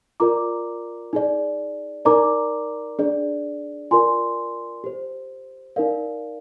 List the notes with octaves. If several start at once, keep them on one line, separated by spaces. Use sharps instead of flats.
F4 A#4 D5 A#5 D6
D#4 G#4 D5
D#4 A#4 D5 A#5 D6
D4 G#4 D5
F4 A#4 D5 G#5 C6
G4 C5
D#4 A#4 D5 F5